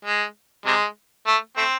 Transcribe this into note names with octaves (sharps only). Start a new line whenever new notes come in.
G#3
C3 G#3
A3
A3 C4